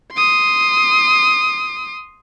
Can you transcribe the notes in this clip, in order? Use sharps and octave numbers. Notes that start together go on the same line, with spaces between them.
C6 D#6